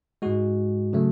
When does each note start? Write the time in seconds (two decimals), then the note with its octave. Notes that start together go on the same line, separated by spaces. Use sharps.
0.22 G#2 G#3 F#4
0.93 C#3 F#3 A3